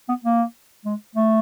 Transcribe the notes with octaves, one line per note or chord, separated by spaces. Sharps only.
B3
A#3
G#3
A3